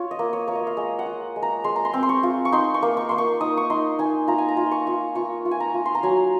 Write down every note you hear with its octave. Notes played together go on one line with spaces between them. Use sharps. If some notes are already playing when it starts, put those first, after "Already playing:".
Already playing: F4 C#5
D#5
A#3
C#5
A#3 C#5
D#5
F5
G#3 D#5
F#5
F4
G#3
A#5
G#3 C6
A#5
C6
C4
C6
C#6
F4
C#6
D#4 C6
C#6
A#3
C#6
A#3 C6
C#6
D#4 D#6
C#6
D#4 C6
D#4 G#5
F4 A#5
G#5
A#5
F4
C6
C#6
F4
F4 C#6
F4
G#5
A#5
F4
C6
A#5
F#3 G#5